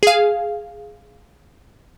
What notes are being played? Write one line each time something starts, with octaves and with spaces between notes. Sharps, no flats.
G#4 F5